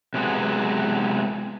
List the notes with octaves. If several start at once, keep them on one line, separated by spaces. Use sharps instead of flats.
C3 F#3 G#3 B3